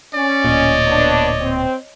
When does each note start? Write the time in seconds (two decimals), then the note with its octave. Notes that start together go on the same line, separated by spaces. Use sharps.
0.14 C#4 D5
0.44 D1 A#2 C#5 D#5
0.87 B3 D4
1.41 C4